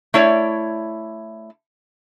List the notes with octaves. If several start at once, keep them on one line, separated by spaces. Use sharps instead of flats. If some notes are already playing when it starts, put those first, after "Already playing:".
A3 E4 C#5 D5